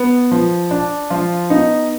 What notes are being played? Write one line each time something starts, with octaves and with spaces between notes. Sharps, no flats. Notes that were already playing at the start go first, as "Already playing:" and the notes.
Already playing: B3
F3
D4
F3 F4
B3 D#4